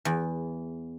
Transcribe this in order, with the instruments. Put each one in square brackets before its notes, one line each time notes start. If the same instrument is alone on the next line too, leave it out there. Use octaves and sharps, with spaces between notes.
[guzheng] E2